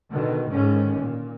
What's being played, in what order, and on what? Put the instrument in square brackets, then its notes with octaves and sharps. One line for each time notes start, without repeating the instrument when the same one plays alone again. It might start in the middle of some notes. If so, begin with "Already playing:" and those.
[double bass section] B2 D3 D#3
G#2 D3 D#3 C#4
A#2